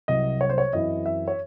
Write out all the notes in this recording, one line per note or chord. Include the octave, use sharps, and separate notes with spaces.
C2 C3 F#3 D#5
C#5
C5
C#5
F#2 E3 C4 E4 D#5
E5
C#5